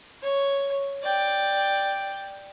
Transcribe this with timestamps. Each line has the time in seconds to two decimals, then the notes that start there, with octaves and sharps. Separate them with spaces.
0.22 C#5
1.02 D5 G5